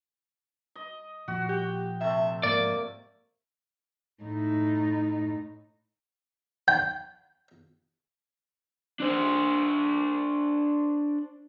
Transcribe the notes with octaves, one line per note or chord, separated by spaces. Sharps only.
D#5
A#2 F3 F#4
G4 G5
C3 A3 E5
G#2 F3 A#3 D5 D#5
A2 D#4
G5
D4 C5